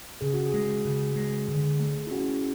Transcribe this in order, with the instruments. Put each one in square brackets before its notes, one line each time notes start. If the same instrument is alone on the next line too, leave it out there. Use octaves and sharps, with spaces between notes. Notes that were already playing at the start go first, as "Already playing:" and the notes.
[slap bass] C#3 [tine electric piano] G#4
[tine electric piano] F#4
G#4
[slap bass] G#3
C#3
G#3
D3
A3
[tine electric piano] E4
[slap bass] C#4 [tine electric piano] F#4